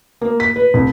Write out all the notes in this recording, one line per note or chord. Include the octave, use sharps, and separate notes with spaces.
A#3
B6
B4
C2